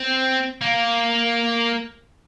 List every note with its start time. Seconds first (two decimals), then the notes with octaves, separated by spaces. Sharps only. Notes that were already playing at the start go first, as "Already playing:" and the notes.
Already playing: C4
0.61 A#3